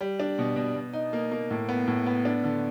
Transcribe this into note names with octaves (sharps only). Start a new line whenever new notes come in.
G3
D4
B2
B2
B2
D#4
A#3
A#3
A2
B3
A2
B3
D4
D3